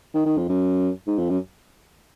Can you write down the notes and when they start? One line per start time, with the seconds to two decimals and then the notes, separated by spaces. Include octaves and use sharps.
0.15 D#3
0.26 D#3
0.38 F2
0.49 F#2
1.07 G#2
1.18 F2
1.30 F#2